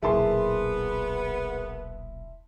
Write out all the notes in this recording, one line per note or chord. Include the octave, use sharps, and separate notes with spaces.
D#1 B1 B3 E4 G#4 A#4 A5 C6